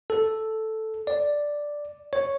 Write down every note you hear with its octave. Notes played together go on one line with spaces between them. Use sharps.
A4
D5
C#5